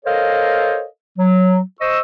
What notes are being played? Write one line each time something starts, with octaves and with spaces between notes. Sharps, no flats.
A4 A#4 C5 C#5 D#5 F5
F#3
C5 D#5 C#6 E6